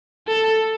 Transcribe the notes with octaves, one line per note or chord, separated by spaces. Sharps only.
A4